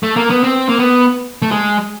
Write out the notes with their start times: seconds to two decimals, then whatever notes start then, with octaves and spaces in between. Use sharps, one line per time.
0.03 A3
0.16 A#3
0.30 B3
0.43 C4
0.69 A#3
0.79 B3
1.42 A3
1.51 G#3